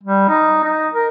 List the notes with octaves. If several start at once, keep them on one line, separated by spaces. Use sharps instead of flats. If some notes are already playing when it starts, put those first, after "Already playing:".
G3
D#4
D#4
A#4